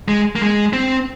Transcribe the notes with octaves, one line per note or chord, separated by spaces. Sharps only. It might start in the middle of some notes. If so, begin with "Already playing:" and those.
G#3
A#3
G#3
C4